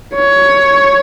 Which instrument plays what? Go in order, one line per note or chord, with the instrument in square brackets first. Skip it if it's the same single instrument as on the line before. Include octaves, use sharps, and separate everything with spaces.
[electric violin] C#5